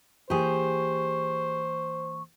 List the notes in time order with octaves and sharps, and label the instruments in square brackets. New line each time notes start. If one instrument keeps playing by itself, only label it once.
[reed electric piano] E3 A#3 [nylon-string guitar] G4 G#4 [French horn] C5 [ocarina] C#6